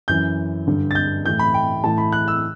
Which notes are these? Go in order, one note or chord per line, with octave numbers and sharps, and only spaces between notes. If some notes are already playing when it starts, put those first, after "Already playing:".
F#2 E3 G6
G2 D3
A6
G6
A2 E3 G6
B5
G5
A2 E3 A5
B5
F#6
E6